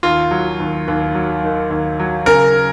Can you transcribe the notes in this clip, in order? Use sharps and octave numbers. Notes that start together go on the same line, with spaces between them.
D#2 F4
F#3
D#2
D#2
F#3
D#3
D#2
F#3
C#3 A#4